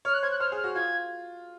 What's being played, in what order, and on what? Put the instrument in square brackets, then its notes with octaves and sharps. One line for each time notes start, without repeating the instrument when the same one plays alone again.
[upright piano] C#5 [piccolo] F6
[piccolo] F#6
[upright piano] C5 [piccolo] G#6
[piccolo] F#6
[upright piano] C5 [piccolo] F6
[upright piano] G#4
[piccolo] F6
[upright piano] F#4
[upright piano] F4 [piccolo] G#6